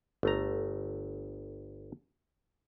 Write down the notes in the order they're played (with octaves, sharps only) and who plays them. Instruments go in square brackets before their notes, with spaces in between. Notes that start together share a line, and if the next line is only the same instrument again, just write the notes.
[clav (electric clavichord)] G1 A3 A#5